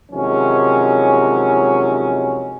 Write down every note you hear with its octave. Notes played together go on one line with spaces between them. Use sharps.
C3 D#3 F3 F#3 G#3 C#4